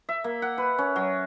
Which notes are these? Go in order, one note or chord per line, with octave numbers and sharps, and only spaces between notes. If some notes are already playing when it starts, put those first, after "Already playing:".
E5
A#3
F#5
B4
C#4
F#3